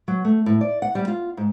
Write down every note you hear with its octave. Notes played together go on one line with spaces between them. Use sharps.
F#3
A3
A2
D5
F#5
G3
F4
G#2